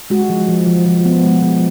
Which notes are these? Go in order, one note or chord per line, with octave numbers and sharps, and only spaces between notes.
G#3 F#4
F3
F3
F3
F3
B3
G#3
F3